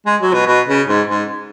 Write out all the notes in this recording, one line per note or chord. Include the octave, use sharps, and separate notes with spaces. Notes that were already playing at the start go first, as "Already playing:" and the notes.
G#3
F#3
B2
B2
C#3
G#2
G#2